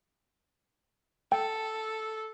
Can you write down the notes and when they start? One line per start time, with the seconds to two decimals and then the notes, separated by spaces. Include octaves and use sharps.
1.32 A4 G5